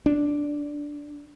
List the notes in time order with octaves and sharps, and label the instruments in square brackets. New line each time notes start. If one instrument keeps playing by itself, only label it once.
[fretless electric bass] D4